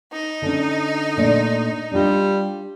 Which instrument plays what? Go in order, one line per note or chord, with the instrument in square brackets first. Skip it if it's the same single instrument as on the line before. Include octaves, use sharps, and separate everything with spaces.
[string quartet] D#4
[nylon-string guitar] D3 C#4
A#2 A3 D4
[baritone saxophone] G3 [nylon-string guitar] D4 F4